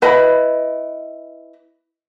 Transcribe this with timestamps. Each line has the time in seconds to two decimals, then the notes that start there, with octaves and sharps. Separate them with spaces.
0.02 E4 B4 D#5 B5